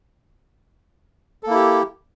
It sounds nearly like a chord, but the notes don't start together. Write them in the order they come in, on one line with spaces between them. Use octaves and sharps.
A4 A#3 E4 G4